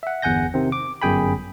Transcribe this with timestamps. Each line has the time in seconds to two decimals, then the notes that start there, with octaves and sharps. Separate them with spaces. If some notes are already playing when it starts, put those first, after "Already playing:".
0.03 E5 F#5
0.22 G1 E2 F#5 G#5 G6 A#6
0.54 C3 D#3 C4
0.72 D6
1.02 G1 F#2 G#4 G5 G#5 B5